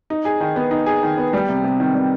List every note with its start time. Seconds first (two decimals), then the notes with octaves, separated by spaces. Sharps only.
0.10 D#4
0.25 G#4
0.41 D#3
0.56 B3
0.71 D#4
0.86 G#4
1.03 D#3
1.18 B3
1.33 G3
1.49 C3
1.64 C3
1.80 D#3
1.94 G3